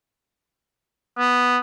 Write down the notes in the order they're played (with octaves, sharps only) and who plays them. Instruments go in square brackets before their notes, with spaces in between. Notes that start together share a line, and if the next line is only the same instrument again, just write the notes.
[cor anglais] B3